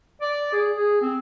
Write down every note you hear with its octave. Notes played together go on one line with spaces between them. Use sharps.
D5
G#4
G#4
C4